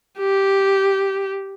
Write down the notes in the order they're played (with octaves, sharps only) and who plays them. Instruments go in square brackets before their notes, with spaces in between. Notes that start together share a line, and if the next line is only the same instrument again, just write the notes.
[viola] G4